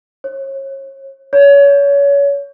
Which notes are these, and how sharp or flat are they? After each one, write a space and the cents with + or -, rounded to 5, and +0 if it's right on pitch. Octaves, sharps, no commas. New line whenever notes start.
C#5 -35
C#5 +30